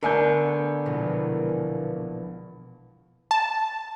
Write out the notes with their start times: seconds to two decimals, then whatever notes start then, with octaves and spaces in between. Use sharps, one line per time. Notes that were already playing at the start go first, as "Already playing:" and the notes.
0.03 D3 A3 B3 A#4 G#5 G6
0.86 E1 A#1
3.31 A5